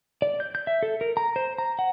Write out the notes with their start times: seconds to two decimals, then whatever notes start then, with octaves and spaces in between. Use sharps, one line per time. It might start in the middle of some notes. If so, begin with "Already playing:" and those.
0.22 D5
0.40 G6
0.55 G6
0.67 E5
0.83 A4
1.01 A#4
1.17 A#5
1.36 C5
1.58 A#5
1.79 F#5